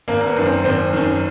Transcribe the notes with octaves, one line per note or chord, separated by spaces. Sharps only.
G#1 A#3
A#3
B3
F#2 D#3
C4
G#1 C4
F#2 D#3